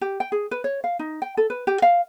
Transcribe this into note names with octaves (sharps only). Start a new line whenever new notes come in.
G4
G5
G#4
B4
C#5
F5
D#4
G5
A4
B4
G4
F5